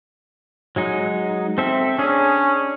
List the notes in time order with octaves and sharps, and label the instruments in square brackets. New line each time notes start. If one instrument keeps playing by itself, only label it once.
[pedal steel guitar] F#3 G#3 D#4
C4 A4 E5
[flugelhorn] C#4 [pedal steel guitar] D4 G#4